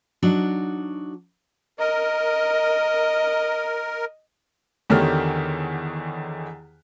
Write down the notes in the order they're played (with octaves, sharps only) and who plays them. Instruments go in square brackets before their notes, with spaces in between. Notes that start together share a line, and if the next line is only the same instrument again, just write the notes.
[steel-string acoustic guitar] F#3 D4 D#4 F#4
[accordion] A#4 [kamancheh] D#5
[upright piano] E2 D3 D#3 G4 C#5 F6